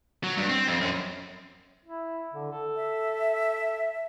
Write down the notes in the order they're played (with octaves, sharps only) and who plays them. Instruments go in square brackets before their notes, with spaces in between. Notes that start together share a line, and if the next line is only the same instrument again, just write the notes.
[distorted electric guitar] F#3
G2
C4
F2
F#2
[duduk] E4
D3
A4
[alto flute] E5